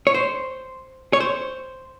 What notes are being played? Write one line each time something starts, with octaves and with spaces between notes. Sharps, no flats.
C#5
C5
C#5
C5